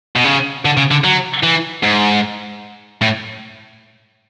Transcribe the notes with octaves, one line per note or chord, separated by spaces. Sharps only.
B2
C#3
D3
C#3
D3
F#3
E3
G#2
A2